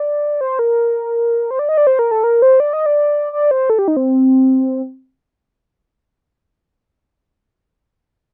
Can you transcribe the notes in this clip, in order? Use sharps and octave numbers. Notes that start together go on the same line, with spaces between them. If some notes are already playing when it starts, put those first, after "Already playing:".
Already playing: D5
C5
A#4
C5
D5
D#5
D5
C5
A#4
A4
A#4
C5
D5
D#5
D5
D5
C5
A4
G4
D#4
C4